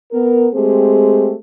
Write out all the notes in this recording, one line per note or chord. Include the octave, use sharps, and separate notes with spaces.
B3 A#4
G#3 A3 C4 G4 G#4